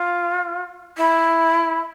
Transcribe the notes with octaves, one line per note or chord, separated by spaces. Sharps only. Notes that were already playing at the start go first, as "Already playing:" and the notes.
Already playing: F4
E4